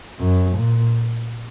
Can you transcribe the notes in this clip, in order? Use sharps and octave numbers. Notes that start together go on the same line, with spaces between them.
F#2
A#2